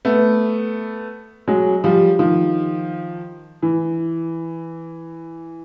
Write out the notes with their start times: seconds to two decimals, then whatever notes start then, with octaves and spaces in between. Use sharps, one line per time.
0.05 A3 B3
1.48 F#3 G#3
1.84 F3 G3
2.19 D#3 F3
3.62 E3